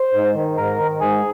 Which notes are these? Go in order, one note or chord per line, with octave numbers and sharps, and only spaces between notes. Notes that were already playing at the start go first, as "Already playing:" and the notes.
Already playing: C5
G#2
D#3
G#2 A#4
D#3
G#2 G#4